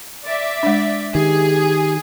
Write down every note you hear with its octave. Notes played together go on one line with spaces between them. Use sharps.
D5 E5
G#3 D4
D#3 G4 G#4